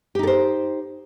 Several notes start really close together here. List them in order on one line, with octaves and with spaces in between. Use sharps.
G4 D#4 A4 C5